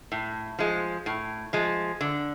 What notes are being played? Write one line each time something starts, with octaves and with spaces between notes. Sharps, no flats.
A2
F3 G#3
A2
F3 G#3
D3